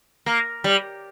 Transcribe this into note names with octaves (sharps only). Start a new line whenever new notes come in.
A#3
G3